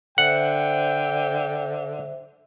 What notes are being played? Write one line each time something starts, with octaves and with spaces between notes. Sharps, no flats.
D3 C5 E5 F#5 G5